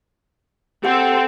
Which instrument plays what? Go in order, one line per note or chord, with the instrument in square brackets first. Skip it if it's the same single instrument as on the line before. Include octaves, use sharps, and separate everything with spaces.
[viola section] C4 A4 [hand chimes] G4 F#5 G5